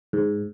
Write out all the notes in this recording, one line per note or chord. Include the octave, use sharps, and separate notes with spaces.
G#2